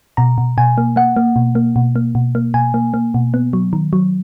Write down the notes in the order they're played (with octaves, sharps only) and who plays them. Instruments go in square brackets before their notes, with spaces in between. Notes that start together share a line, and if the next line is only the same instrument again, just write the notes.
[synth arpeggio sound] B2 A#5
B2
B2 G#5
A#3
A#3 F#5
A#3
B2
A#3
B2
A#3
B2
A#3
B2 G#5
A#3
A#3
B2
B3
F#3
D#3
F#3